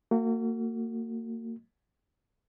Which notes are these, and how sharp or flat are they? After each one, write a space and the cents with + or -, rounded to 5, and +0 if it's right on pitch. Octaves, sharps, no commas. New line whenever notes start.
A#3 -35 F#4 +0